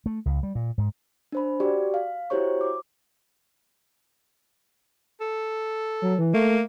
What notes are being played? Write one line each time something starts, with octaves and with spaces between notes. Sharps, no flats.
A3
C#2
G3
A#2
G#2
D4 C5 B5
F#4 G4 D5
F5
E4 F#4 G4 C5 C#5 C#6
D6
A4
F#3
E3
A3 A#3